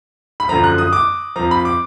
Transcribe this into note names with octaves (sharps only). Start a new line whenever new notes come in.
B5
F#2 D3 F3 A#5
F#6
D#6
D6
F2 F3 A#5
B5
D6